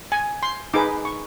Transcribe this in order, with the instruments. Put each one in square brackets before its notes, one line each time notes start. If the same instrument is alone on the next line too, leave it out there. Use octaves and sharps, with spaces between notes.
[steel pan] G#5
C6
D#4 G#4 B4 D6
C#6